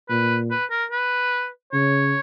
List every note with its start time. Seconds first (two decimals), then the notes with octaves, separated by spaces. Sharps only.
0.09 A#2 B4
0.51 B4
0.71 A#4
0.91 B4
1.73 C#3 C#5